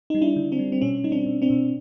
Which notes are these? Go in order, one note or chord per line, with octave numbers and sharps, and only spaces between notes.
G3 D#4
D4 E4
D3
C4 D4
G3
C4
B2 C#4
G3 D#4
C4 D4
B2
C4 D4
B2